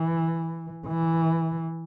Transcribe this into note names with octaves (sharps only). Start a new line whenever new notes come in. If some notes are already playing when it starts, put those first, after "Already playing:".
Already playing: E3
E3